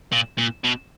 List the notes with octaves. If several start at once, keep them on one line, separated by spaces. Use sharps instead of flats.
A#2
A#2
B2